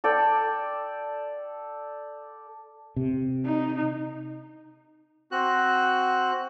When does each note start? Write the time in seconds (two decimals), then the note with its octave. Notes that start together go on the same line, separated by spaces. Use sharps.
0.04 A4 D5 G5
2.96 C3
3.45 D#4
5.32 C4 F#4 F#6